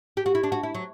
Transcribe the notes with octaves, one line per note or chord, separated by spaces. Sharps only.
G4
F#4
E4
D4
F#4
E4
F#3